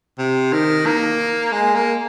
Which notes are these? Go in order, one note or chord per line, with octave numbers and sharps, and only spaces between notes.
C3
D#3
A#3
G#3
A#3